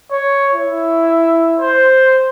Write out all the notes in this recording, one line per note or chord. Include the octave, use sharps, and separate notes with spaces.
C#5
E4
C5